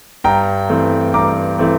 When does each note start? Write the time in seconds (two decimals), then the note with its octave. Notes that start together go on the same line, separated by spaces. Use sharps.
0.24 G2 G5 A#5
0.69 E3 A3 C4
1.14 G2 A#5 D6
1.59 E3 A3 C4